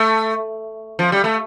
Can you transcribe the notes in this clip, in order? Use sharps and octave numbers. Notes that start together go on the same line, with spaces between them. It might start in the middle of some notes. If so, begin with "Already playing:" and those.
Already playing: A3
F3
G3
A3